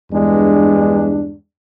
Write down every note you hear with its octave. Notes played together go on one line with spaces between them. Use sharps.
E2 G2 G#3 D4